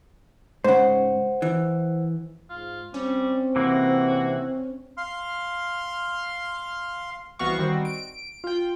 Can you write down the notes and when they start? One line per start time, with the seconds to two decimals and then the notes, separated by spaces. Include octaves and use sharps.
0.64 G#2 C#3 C5 F#5
1.42 E3
2.50 G#2 F4
2.94 G3 C4 C#4
3.56 C3 E3 A#3 F#4
4.97 F5 C6 F6
7.39 C2 E3 B3 F#4 F5 C#6
7.59 D#3 G3 C4 F#4
7.85 D7
8.44 F4 G5